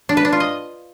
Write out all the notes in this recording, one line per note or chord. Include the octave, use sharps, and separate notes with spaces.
D4
B4
D4
F4
D#5